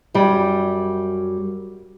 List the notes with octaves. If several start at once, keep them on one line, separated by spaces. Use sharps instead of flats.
F#2 G3